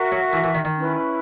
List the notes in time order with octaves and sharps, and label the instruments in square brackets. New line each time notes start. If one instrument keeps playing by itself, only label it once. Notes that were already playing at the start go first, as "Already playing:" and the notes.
Already playing: [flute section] F#4 A#4 E5
[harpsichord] F#3
E3
E3
D#3
D#3
[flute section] C#4 E4 B4